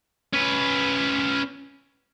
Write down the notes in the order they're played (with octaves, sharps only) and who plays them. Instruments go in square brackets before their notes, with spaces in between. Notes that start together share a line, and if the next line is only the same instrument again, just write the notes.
[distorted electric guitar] C#4 B4